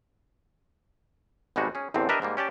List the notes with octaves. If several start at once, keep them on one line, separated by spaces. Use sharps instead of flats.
G#1 B2 G3 G#3 D#4 F#4
C#4 G#4
A1 E2 A2 D3 C4
D4 G4 A#4 B4 D#5 E5
G#2 G3 A#3
C#4 G4 D5 A5